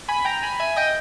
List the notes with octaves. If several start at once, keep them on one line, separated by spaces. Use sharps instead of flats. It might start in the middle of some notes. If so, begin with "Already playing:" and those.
G#5 B5
G5 A#5
G#5 B5
E5 G#5
D#5 G5